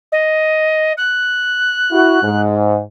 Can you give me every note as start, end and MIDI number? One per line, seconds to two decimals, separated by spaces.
0.12 0.93 75
0.97 2.41 90
1.91 2.19 64
1.91 2.19 66
2.23 2.79 44